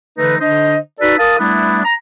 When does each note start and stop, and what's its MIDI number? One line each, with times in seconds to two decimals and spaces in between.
0.18 0.36 50
0.18 0.36 52
0.18 0.36 57
0.18 0.36 63
0.18 0.36 71
0.40 0.78 50
0.40 0.78 62
0.40 0.78 72
0.40 0.78 75
1.00 1.18 63
1.00 1.18 66
1.00 1.18 69
1.00 1.18 71
1.00 1.18 74
1.19 1.37 70
1.19 1.37 77
1.19 1.37 81
1.19 1.37 87
1.40 1.84 55
1.40 1.84 57
1.40 1.84 59
1.40 1.84 62
1.40 1.84 64
1.85 1.95 82